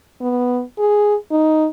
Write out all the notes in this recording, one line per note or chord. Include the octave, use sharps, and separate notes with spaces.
B3
G#4
D#4